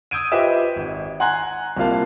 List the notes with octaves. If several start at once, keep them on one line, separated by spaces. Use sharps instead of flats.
D#6 E6 G6 G#6 D7 D#7
F4 G4 B4 C5 D#5 E5
G#1
F#5 G#5 A#5 C6 F#6 G#6
C2 A#3 C4 F4 F5 A5